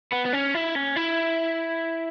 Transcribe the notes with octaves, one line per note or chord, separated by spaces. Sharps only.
B3
B3
C#4
E4
C#4
E4